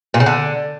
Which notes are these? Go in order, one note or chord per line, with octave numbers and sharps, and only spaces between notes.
A#2
C#3
D3